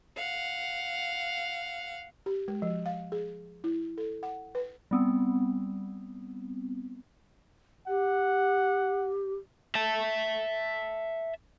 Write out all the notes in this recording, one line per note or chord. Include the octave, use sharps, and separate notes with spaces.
F5 F#5
G4
G#3
F3
F5
G#4
E4
A4
F#5
B4
G3 B3 C4
G4 F#5
E5 A5